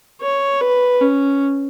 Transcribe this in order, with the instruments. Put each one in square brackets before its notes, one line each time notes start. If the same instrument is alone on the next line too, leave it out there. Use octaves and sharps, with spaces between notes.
[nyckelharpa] C#5
B4
C#4